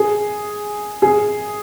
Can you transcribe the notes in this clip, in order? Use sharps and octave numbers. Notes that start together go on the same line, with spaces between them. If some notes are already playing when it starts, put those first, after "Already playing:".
Already playing: G#4
G#4